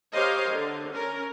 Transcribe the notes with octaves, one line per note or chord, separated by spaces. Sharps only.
G4 A#4 C5 C#5 D#5 F5
D3
C#4 A#4